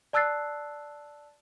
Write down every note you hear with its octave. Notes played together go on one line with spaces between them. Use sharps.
D5 A5 E6 F#6 A6 C7